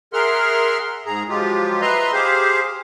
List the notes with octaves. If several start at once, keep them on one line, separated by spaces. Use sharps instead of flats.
G#4 A#4 E5 F#5 C6 F6
G#2 G#4 A#5
F3 F#3 G#3 F4 G4
B4 D#5 E5 A#5 C6
G4 G#4 C5 F5